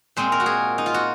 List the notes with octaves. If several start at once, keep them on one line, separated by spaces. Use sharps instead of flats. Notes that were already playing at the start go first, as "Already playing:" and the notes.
A#2 G#3 C4 C5
A#4
F#4
G#4
D#4
F4
F#4